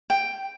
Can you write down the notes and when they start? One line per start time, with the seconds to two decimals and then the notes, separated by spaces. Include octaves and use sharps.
0.10 G5